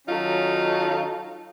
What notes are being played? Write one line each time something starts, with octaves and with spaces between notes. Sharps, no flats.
D#3 F#3 C#4 D#4 F4 A4